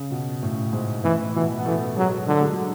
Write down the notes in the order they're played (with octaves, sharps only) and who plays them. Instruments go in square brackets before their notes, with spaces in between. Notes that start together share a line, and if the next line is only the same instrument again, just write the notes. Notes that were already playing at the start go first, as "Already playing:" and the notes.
Already playing: [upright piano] C#3
B2
A2
G#2
[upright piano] A2 [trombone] E3
[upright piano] B2 [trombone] E3
[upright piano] B3
[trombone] E3 [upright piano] A3
[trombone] F#3 [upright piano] G#3
[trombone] D3 [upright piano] F#3
[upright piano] G#3
F#3